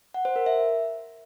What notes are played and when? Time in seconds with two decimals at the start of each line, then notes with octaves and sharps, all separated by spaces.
0.14 F#5
0.25 C5
0.36 A#4
0.46 E5